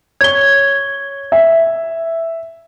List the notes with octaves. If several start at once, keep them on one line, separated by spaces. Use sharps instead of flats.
C#5 G#6 G7
E5